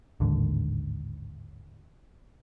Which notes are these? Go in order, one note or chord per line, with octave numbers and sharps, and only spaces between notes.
A1 D#2 G#2 D3